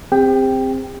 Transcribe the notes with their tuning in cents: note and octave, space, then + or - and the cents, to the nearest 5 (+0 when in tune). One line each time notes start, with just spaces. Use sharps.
C4 +0 G4 +40 G5 +0